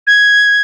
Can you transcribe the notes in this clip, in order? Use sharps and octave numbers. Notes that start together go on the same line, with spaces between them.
G#6